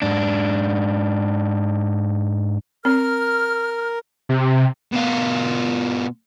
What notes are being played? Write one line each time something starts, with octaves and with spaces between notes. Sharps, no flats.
G#2 D4
C4 A#4 F6
C3
B2 F4